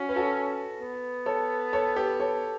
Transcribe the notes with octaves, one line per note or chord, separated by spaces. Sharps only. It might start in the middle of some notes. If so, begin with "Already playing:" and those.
Already playing: C#4 F#4
B4
F#4 A4
B3
A4 C#5
A4 C#5
G4 B4
A4 C#5